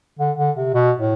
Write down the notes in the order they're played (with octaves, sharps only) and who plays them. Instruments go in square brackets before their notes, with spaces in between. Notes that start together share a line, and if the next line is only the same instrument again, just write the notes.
[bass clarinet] D3
D3
C3
B2
A2